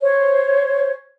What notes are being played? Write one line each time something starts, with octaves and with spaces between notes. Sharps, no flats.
C5 C#5